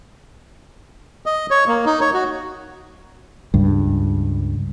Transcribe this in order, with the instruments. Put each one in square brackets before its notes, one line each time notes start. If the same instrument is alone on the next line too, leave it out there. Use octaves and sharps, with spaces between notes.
[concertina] D#5
C#5
A#3
D#4
C#5
F#4
[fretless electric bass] C#2 G2